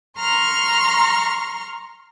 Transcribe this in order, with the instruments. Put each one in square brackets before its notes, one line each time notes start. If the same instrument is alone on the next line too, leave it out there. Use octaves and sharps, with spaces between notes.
[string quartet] A#5 C6 C#6 F6